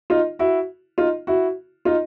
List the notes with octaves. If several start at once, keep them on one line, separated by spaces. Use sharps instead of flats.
D#4 F4
E4 F#4
D#4 F4
E4 F#4
D#4 F4